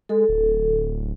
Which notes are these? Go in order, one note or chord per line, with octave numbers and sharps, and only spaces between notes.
G#3 A4
D1